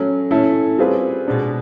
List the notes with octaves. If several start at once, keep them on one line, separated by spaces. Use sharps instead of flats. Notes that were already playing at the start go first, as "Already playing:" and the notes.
Already playing: F#3 A3 C#4
A3 C#4 E4 A4
G3 C4 F4 G#4 B4
B2 G#3 B3 D4